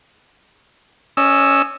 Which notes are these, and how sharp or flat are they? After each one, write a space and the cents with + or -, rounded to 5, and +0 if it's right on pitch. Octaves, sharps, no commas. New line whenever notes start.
C#4 +5 D#5 -35 E6 +0